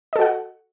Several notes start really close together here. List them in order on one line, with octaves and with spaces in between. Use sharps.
D#5 A4 F#4 F#5